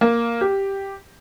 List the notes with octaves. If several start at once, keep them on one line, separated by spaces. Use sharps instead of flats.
A#3
G4